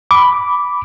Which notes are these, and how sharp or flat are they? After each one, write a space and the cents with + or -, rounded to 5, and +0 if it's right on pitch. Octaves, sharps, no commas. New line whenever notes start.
B5 +0 D6 -10